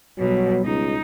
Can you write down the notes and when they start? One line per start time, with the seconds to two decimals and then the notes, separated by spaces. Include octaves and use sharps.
0.18 B2 F#3 G3
0.65 C#2 D#4